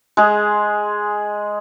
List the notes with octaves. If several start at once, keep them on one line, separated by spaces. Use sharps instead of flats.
G#3 G#4